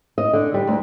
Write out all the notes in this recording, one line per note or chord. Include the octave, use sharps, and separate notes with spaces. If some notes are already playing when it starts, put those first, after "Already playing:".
D#5
D3
G3
D2